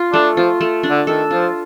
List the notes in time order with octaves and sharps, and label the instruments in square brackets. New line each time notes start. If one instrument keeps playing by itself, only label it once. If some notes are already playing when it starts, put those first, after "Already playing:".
Already playing: [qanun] F4
[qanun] A3 [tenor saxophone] D4
[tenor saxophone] F3 [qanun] F4
[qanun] A3
D4
[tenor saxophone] D3
[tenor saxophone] D#3 [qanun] A4
[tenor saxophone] F3 [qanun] F4